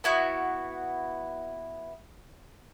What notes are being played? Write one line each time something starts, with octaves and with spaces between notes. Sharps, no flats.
B3 E4 F#4